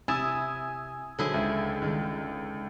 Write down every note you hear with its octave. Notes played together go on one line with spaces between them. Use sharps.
C3 E4 G#5 D#6 E6 A6 E7
D3 F#3 E4 G#4 A4 C5
C#2 E5
D#3 G#3